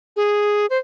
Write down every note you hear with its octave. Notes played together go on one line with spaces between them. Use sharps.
G#4
C5